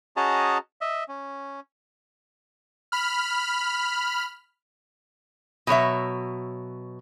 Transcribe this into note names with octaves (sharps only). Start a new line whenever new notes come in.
C#4 F#4 G#4 D#5 A5 A#5
D#5 E5
C#4
B5 F6
B2 F#3 C#5 E5